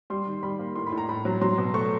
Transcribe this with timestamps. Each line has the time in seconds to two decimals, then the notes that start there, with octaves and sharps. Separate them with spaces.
0.10 G3 C6
0.26 D#3
0.43 G3 B5
0.59 A#3
0.76 A2 C6
0.86 B5
0.92 A2
0.98 A#5
1.09 A2 B5
1.25 F#3
1.41 F#3 C6
1.58 B2
1.74 A3 C#6